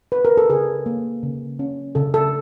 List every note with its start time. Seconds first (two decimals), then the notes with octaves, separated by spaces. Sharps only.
0.12 B4
0.25 A#4
0.37 A4
0.50 C#3 G#4
0.86 A#3
1.23 C#3
1.59 C#4
1.95 C#3 A4
2.14 A4